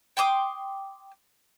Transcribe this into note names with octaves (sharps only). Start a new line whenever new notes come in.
G5 C6 D6 D#6